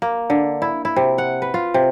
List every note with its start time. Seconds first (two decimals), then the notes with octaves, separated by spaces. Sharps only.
0.02 A#3
0.30 D3
0.62 E4
0.85 E4
0.96 C3
1.18 F#5
1.42 B4
1.54 F4
1.74 C3